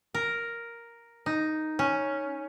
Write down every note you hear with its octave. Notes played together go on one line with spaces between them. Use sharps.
A#4
D#4
C#4